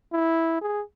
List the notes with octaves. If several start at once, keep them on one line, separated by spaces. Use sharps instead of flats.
E4
G#4